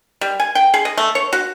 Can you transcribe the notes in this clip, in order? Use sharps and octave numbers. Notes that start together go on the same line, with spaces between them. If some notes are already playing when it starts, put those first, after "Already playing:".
G3
G#5
G5
G#4
D#5
A3
C#5
F#4